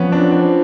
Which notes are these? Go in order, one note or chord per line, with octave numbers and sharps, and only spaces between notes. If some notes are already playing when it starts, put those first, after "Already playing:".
Already playing: F3 B3 C#4
C4 D4
C4 D4